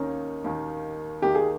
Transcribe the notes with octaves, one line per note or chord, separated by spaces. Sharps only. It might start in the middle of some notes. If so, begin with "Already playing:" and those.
Already playing: D#2 D#3 A#3 C#4 D#4
D#2 D#3 A#3 D#4
D#2 D#3 A#3 D#4 G4
G#4